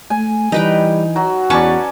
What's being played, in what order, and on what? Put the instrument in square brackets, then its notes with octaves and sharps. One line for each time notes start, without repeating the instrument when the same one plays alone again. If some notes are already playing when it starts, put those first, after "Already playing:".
[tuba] A3 [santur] G#5
[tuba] E3 [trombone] G3 [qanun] D#4 B4 G5
[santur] F#3 [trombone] F#4
[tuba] E2 [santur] C#4 D5 [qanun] B4 A5 C#6